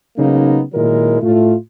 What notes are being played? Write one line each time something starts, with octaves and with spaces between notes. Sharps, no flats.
C#3 F#3 A#3 B3 D#4
A#2 D#3 F#3 G#3 E4 A#4
A2 A3 F4